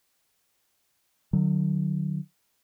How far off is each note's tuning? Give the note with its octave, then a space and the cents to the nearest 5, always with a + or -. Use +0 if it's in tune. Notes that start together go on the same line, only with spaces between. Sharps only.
D3 +45 F#3 +0